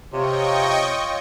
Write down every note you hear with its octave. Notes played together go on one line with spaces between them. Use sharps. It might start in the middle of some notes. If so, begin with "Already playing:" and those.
C3 F4 C#5 D#5 G5 C#6